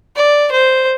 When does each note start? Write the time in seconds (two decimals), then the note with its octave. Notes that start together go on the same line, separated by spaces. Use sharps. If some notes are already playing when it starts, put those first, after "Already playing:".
0.16 D5
0.52 C5